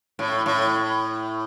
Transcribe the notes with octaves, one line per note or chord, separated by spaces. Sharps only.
A2
A2